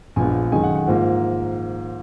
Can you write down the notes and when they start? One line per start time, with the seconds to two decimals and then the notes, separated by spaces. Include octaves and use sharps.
0.16 A#1 A#2 G#3 B3 G#5
0.52 F#2 D#3 G#3 G#5
0.63 F#5
0.75 F#5
0.87 G#2 F3 A#3